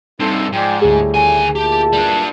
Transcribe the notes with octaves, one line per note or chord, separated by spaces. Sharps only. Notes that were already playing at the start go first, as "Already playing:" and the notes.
G2 C3 D#4 E4 A4
G#2 F3 D5 G5
D2 A2 G3 A3 G#4
D#3 G#5
A#2 E4 G4 A5
G3 D4